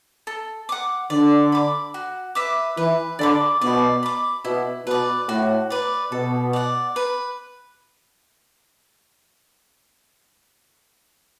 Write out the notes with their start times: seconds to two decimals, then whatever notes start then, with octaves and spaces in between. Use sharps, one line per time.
0.27 A4
0.69 F#5 D6
1.10 D3 D5
1.52 B5 D6
1.94 F#4
2.35 B4 E5 D6
2.77 E3 B4
3.19 D3 D5 B5 D6
3.61 B2 D5
4.03 B5 D6
4.45 B2 E4
4.86 B2 B4 D5
5.28 A2 F#4
5.70 B4 D5
6.11 B2 A4
6.53 D5 F#5
6.96 B4